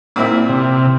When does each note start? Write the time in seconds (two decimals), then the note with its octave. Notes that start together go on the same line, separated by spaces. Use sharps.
0.16 A#2 C4 E4
0.49 C3